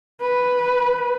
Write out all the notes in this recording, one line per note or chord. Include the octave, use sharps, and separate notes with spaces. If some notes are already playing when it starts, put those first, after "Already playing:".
B4